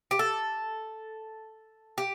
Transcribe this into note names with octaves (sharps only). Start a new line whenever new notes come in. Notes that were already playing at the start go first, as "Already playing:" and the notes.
G4
A4
G4